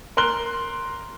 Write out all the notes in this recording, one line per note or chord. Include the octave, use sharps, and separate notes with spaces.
A#4 C6 F#6 G7